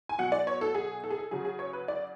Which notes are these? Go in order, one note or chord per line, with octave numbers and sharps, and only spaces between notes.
G#5
B2 F#3 F#5
D5
C#5
A4
G#4
A4
G#4
A4
C#3 F#3 G#4
G#4
C#5
B4
D5